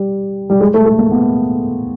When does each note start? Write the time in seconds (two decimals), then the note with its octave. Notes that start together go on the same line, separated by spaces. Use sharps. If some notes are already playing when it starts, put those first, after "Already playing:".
Already playing: G3
0.50 G3
0.61 G#3
0.74 A3
0.86 A3
0.99 A#3
1.11 B3